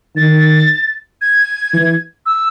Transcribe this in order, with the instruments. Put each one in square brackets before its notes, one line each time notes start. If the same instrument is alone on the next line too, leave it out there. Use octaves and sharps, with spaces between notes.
[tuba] D#3 [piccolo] A6
[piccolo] G#6
[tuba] E3
[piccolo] E6